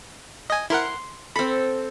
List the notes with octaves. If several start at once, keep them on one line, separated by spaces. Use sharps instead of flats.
D#5 G#5
E4 A#4 F#5 C6
C4 A4 B5